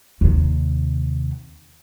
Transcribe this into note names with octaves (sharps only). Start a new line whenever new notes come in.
D#2 C3